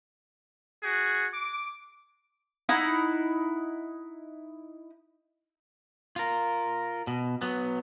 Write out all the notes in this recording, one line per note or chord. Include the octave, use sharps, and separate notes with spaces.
F#4 G#4
D6
D#4 E4 F#5
F4 A#4
B2
F#3 B3